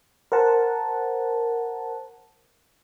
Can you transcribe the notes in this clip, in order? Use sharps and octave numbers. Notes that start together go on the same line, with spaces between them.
A#4 C5 F#5 A5